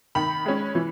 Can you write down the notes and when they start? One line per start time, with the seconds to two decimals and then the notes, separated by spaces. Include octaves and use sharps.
0.15 D#3 B5
0.46 G#3 C#4
0.75 E3